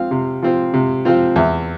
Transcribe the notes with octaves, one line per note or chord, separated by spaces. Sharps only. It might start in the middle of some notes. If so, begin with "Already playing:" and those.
Already playing: F3 C4 F4 F5
C3
F3 C4 F4
C3
F3 C4 F4
E2 E5